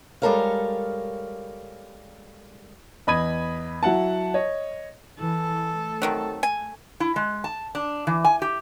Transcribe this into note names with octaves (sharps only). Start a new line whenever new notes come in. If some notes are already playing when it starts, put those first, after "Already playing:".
G3 G#3 A4 A#4 C#5 F5
E2 D#5 B5 D#6 G#6 D#7
F#3 E4 F#5 A5
C#5 D#5
E3 A4
A3
C3 D#3 F#3
G#5
E4
G#3
A5
D4
E3
G#5
G4